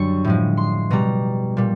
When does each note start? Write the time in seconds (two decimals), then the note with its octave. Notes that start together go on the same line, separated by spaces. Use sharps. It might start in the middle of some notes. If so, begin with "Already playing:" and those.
Already playing: F#2 D3 G3 C#6
0.25 A2 F3 G#3
0.57 C6
0.90 B2 G3 A#5
1.57 A#2 G3